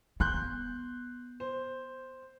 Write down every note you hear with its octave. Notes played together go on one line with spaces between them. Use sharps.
B3 C6 F#6 G6
C5